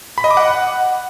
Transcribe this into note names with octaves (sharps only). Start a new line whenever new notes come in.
B5
D#5
D6
F#5